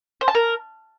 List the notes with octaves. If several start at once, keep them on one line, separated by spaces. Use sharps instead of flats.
C5
A5
A#4